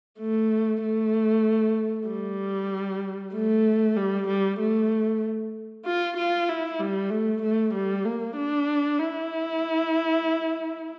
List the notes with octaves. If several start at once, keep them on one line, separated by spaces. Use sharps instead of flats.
A3
A3
G3
A3
G3
G3
A3
F4
F4
E4
G3
A3
A3
G3
A#3
D4
E4